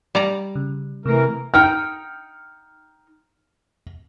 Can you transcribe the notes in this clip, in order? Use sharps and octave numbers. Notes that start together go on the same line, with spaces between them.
G3 D5 A#5
C#3
C3 E3 A3 A#4
D#4 G5 A#5 F6